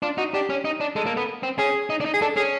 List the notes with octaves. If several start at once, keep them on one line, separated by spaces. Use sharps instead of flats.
D4 F4
D#4 F#4
D4 G4
C#4
D#4
D4
G#3 A4
A#3
B3
C4
C#4 G#4
D#4
D4
D#4
G#4
D4 A4
C#4 G#4